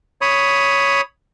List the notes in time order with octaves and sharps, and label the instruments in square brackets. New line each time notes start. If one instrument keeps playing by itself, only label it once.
[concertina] C#5 B5 D#6